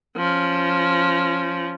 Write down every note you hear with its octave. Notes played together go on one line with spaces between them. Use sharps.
F3 C#4